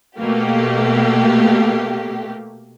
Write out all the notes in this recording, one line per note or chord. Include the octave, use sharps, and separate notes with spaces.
B2 A3 A#3 G4